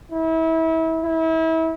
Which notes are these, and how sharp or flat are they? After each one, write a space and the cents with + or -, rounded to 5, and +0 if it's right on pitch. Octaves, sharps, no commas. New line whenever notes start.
E4 -30
E4 -30